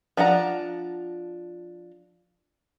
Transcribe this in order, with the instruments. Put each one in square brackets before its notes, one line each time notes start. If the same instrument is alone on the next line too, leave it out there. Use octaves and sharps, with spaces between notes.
[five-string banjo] F3 D4 F#5 A#5